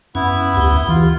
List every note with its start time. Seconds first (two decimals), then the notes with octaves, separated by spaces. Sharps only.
0.15 F#2 B3 C#4 E4
0.57 D2 G4 F#5
0.89 E3 F4